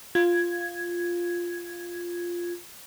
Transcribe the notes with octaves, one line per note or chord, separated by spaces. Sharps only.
F4 G#6